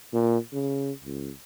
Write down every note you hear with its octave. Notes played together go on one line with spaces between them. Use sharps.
A#2
C#3
C#2